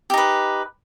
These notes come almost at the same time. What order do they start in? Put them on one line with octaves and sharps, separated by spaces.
G4 D#4 B4